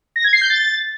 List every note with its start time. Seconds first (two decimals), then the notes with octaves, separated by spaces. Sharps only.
0.16 A#6
0.24 G#6
0.33 C7
0.41 G6
0.50 A6